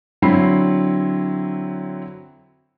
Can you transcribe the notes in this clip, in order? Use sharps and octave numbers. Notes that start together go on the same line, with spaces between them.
D3 F#3 C4 E4 B5 C7